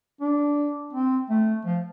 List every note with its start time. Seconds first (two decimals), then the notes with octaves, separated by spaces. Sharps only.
0.21 D4
0.93 C4
1.30 A3
1.65 F3